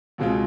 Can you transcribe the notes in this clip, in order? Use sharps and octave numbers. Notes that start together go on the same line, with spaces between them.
C#2 B2 G#3 C4 F4